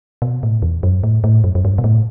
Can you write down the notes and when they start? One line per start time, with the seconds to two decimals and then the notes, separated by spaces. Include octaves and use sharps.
0.22 B2
0.43 A2
0.62 E2
0.83 F#2
1.04 A2
1.24 A2
1.44 F#2
1.55 F#2
1.65 G2
1.78 B2
1.84 A2